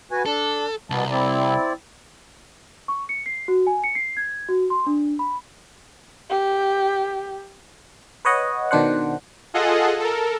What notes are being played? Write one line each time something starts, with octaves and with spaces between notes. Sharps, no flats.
F#4 B4 G#5
D4 A4
C2 B2 B3 A5
C4 E4 D5
C#6
C#7
C7
F#4
G#5
C#7
C7
G#6
F#4
C6
D4
B5
G4
B4 C#5 D#5 F#5
B2 D#3 D4 C5 F#5
F4 G#4 A4 D#5 F#5
A4 A#4